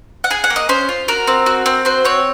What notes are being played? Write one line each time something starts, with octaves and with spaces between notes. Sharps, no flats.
F#5
G#4 G#5
F#5
A#3
D#5
C#4 C5
F4
F#4 A#4
C4
F#4
C4
F#4 C5
C4 C#5